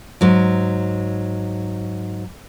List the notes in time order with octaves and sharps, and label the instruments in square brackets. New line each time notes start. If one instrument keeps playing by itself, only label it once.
[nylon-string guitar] G#2 F#3